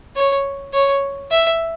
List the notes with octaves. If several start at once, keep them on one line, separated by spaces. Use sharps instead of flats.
C#5
C#5
E5